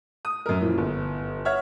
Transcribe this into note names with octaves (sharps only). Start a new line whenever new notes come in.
D#6
F#2 A#4
A#2 E3 F3
G1
C#5 E5 F#5 F6 G#6